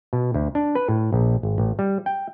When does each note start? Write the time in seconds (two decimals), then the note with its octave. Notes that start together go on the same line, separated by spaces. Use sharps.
0.13 B2
0.34 D2
0.55 D4
0.75 B4
0.89 A2
1.13 A#1
1.43 G#1
1.58 A1
1.79 G3
2.06 G5